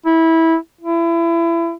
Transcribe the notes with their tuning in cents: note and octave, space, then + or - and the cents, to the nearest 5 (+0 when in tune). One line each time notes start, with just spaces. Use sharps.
E4 -15
E4 +30